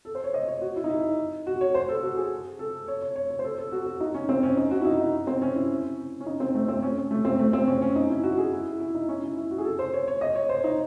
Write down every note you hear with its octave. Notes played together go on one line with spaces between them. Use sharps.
A4
C5
C#5
D#5
C#5
F#4
E4
D#4
E4
F#4
C#5
C5
A4
F#4
G#4
A4
C#5
C#5
C#5
C#5
C5
A4
A4
F#4
F#4
D#4
C#4
C4
C#4
D#4
F#4
E4
D#4
D#4
C4
C#4
E4
C#4
D#4
C4
A3
C4
C#4
A3
C4
A3
C4
C#4
C#4
D#4
E4
F#4
G#4
E4
E4
D#4
C#4
E4
E4
F#4
G#4
A4
C5
C#5
C#5
D#5
C#5
C5
D#4